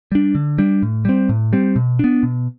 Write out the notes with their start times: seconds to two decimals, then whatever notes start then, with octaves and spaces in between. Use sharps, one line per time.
0.12 G3 D4
0.35 D3
0.58 G3 D4
0.83 A2
1.05 G3 C4
1.29 A2
1.53 G3 C4
1.76 B2
1.99 B3 D4
2.23 B2